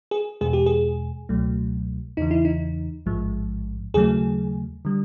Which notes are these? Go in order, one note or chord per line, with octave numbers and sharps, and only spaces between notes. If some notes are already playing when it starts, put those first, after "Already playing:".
G#4
E2 B2 G#3 G#4
G4
G#4
C#2 B2 F#3 A3
E2 C#3 E3 D#4
E4
D#4
A1 G#2 F3 G#3
D#2 C#3 F#3 A3 G#4
D3 G3